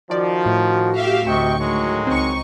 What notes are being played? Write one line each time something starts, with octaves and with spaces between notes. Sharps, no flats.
D#3 F3 F#4 D5
A2
G4 E5 F5
D2 C3 D#5 G5 C#6
D#3 F#3 G#3
C#2 C4 D#4 C#6